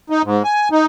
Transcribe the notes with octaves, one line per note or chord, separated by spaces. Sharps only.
D#4
G#2
G#5
D#4